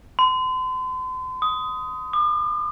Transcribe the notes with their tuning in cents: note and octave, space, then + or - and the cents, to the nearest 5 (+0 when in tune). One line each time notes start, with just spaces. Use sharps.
C6 -40
D#6 +10
D6 +45